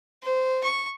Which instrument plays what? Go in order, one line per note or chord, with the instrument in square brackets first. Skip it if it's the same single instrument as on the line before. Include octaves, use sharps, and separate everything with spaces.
[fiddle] C5
C#6